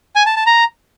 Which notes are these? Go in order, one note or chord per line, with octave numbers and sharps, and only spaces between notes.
G#5
A5
A5
A#5